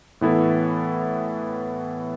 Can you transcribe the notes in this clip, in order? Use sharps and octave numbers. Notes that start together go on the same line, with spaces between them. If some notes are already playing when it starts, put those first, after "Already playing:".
A2 E3 B3 E4 A4